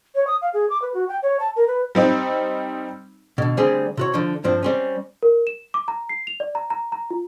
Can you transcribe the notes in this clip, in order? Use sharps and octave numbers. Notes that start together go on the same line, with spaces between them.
C#5
D#6
F5
G#4
D6
B4
F#4
G5
C#5
A5
A#4
B4
G3 C4 D#4
B2 D3
D2 D3 G3 C4 G4 G#4
C3 F#4 C#5
D3 F3
G2 F3 C4 D4
G3 C4 C#4
A#4
E7
D6
A#5
C7
F7
D5
A#5
A#5
A#5
F4